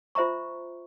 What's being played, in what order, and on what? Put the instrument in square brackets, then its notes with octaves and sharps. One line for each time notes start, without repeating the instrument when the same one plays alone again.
[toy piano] F4 C5 E5 A#5 C#6